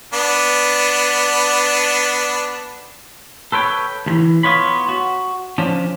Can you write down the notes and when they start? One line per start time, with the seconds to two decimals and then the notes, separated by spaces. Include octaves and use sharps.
0.13 B3 D4
3.52 A4 B4 C#5 G5
4.06 D#2 E3
4.43 B3 F4 C#5 B5
4.89 F#4
5.58 F3 C#4 D4